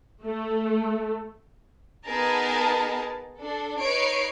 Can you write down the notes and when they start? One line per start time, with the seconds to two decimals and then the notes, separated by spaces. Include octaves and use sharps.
0.24 A3
2.06 B3 D#4 G#4 A#4 A5
3.37 D4 A4
3.80 D#4 B4 C#5 C7 D7